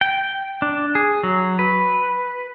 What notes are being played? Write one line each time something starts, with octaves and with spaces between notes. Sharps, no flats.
G5
D4
G#4
F#3
B4